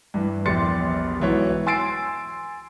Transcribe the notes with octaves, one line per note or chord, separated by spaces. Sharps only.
G2 E3
A#1 E2 G4 C6 A6 C#7
B1 G#2 E3 F#4 C#5
G#5 C6 E6 A6 C7 D7